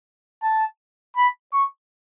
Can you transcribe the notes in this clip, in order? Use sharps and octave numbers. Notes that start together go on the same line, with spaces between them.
A5
B5
C#6